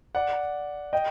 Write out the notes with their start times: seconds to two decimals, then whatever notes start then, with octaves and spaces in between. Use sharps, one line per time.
0.15 D5 F#5
0.93 D#5 G5